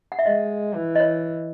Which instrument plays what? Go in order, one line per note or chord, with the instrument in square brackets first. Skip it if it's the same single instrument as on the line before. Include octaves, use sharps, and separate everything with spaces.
[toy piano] F#5
E5
[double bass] G#3 [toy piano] D#5
[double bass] E3
[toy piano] D#5
C#5